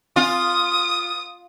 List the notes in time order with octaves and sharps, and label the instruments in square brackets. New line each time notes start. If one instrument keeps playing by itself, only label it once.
[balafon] C4 [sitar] F4 [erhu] D#6